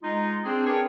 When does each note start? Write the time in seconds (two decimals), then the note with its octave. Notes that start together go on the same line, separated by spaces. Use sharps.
0.04 G#3 D#4 F4
0.44 C4 D4 G#4
0.66 C4 D4 G#4 A#4 B4 C#5